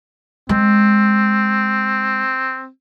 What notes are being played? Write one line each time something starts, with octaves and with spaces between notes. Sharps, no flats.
G#3 C4